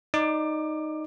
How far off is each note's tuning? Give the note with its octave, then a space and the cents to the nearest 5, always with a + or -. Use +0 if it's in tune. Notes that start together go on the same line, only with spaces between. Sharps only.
D#4 +0 D5 +0 D6 +25